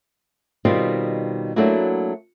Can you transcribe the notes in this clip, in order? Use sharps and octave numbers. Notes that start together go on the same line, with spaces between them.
B2 D#3 G3 C4 F4
F#3 A3 A#3 D4 E4 F#4